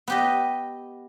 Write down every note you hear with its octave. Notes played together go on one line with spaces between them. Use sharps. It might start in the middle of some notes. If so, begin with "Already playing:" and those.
B3 G4 D#5